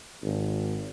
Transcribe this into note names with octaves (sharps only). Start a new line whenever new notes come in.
G#1